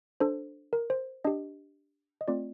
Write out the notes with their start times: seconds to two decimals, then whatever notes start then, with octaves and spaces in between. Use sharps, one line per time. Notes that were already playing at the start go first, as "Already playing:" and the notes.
0.20 D4 A4 C5
0.73 A#4
0.90 C5
1.24 D4 G4 D#5
2.21 D#5
2.28 A3 C4 F4 D5